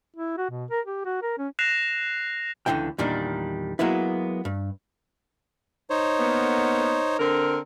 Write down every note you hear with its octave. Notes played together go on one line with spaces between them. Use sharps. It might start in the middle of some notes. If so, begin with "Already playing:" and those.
E4
F#4
B2
A#4
G4
F#4
A#4
C#4
F#6 A#6 C7 E7 F7
C#2 B2 D3 E3 G5
E2 A#2 D#3 G3 D4
F#3 G#3 A#3 B3 E4
G2
D#4 C5 C#5
A#3 B3
D3 C4 A#4